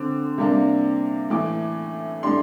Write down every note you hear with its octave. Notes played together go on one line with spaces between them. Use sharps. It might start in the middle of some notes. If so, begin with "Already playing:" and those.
Already playing: D3 C4 D6
C3 G3 A#3 D4
A2 E3 A3 D6
A2 G3 D4 C6